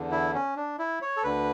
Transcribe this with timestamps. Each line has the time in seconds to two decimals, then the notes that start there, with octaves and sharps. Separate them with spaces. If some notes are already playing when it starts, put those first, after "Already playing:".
Already playing: E2 D3
0.11 E4
0.34 C#4
0.56 D4
0.79 E4
1.02 C#5
1.17 A4
1.24 D2 D3 B4